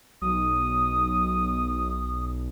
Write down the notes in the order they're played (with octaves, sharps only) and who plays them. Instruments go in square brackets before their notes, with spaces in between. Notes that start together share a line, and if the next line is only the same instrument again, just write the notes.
[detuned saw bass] B1 [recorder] D#6